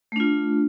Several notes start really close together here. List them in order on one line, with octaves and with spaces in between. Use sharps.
A3 D4 F4